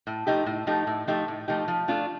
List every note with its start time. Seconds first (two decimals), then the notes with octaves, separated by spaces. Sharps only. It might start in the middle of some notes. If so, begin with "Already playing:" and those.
0.07 A2
0.27 F3 A3 D#4 G4
0.46 A2
0.67 F3 A3 D#4 G4
0.87 A2
1.07 F3 A3 D#4 G4
1.28 A2
1.48 F3 A3 D#4 G4
1.68 F3
1.88 A3 D4 F4